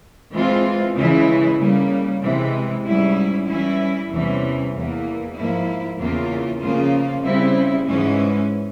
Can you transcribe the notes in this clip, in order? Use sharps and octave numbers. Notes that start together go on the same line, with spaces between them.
E3 G#3 C4 F4
C#3 E3 G#3 E4
C#3 G3 A#3
C3 E3 G#3 C4
G#2 G3 C#4 E4
E3 G3 C#4 E4
E2 C3 E3 G3 C#4
E2 E3 A#3
G#2 F3 A#3 E4
E2 C#3 E3 A#3 F4
C#3 F3 A#3 F4
C#3 G3 C4 E4
G#2 E3 G#3 C#4